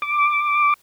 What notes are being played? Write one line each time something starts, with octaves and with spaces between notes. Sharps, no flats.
D6